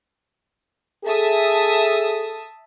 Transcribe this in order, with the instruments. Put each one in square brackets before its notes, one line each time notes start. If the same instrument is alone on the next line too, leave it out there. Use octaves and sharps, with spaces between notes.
[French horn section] G#4 A4 [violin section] E5 A5 D#6